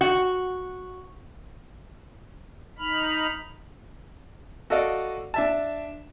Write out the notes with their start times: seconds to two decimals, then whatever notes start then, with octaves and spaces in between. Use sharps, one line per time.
0.01 F#4
2.78 D#4 B5 F6
4.70 F#4 A4 D5 D#5 F5 F#5
5.34 D4 E5 A5